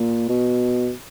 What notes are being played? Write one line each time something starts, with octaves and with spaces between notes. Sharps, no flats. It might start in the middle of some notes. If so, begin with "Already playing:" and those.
Already playing: A#2
B2